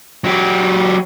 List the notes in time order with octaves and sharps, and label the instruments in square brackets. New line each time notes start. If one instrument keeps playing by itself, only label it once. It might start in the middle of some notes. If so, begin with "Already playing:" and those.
[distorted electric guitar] F#3 G4